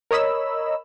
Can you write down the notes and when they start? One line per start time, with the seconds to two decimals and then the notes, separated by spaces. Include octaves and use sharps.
0.11 A#4 C#5 D#5 B5 E6